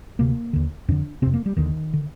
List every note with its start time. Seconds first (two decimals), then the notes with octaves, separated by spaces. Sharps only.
0.19 D2 C3 A#3
0.53 D#2 D3
0.88 F2 D3 D4
1.22 C3 C4
1.26 F2
1.34 A#3
1.46 G3
1.57 D#2 D3 D#3
1.94 D3